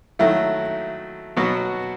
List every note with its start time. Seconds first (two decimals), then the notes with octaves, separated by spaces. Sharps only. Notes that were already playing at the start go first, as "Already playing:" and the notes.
0.19 D#3 F#3 A3 E4
1.37 B2 F#3 B3 F#4